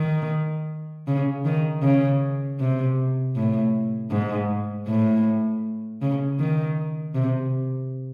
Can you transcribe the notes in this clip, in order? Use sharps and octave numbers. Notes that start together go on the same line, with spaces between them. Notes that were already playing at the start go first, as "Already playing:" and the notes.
Already playing: D#3
C#3
D#3
C#3
C3
A2
G#2
A2
C#3
D#3
C3